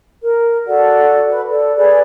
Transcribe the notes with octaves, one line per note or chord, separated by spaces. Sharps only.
A#4
F#4 A4 D5 F#5
B4
A4 D5
G#4 B4 D5